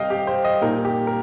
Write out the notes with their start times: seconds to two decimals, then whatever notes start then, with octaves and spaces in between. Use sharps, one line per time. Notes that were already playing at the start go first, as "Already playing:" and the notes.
Already playing: C3 C4 D#5 F5 G5
0.10 G4
0.27 C5
0.45 D#5
0.61 A#2 G3 A#3 D#4 A#4
0.85 G4
1.07 A#4